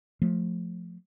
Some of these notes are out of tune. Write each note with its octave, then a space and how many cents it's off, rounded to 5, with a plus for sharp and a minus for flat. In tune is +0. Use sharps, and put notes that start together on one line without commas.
F3 +15 A3 +0